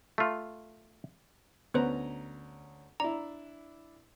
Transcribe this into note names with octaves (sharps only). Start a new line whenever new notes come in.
A3 F4
D2 B3 C#4 B4 C5 A#5
D4 E4 A#5